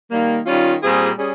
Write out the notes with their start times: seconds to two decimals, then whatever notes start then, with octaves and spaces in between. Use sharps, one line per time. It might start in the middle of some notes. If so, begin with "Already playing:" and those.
0.11 D#3 G3 A#3
0.46 D#3 G3 C#4 F4
0.81 A#2 G3 C4 F4 G#4
1.16 G3 C#4 G#4